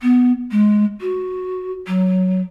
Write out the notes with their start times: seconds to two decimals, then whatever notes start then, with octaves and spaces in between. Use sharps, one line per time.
0.01 B3
0.51 G#3
1.00 F#4
1.87 F#3